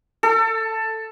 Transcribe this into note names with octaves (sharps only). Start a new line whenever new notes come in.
A4